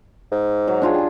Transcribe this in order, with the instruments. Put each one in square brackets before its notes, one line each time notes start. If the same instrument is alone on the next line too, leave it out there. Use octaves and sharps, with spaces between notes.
[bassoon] G#2
[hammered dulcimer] F#3
D4 F4 G#4
G4 G#4